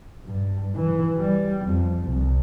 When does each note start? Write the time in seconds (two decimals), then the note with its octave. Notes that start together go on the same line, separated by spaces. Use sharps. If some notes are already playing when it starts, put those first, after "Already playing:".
0.25 G2
0.75 E3
1.17 G3
1.65 F2
2.05 C2